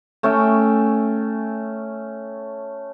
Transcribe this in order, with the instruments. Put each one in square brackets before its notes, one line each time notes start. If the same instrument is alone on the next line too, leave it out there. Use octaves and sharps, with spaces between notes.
[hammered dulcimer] A3 C#4 E5 G5